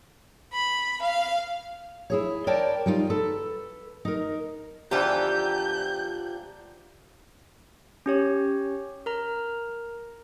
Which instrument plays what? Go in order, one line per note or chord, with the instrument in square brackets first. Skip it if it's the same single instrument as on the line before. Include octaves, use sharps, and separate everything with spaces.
[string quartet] B5
F5
[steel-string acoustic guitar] E4 G#4 C#5
A#4 C#5 D5 G5 A5
G3 D#4 F4
A4 B4
D#4 A#4
[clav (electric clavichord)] E2 D3 E3 [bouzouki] F3 G4 [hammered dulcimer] D4 A#5 [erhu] G6
[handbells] C#4 G4 C#5
A#4 A#5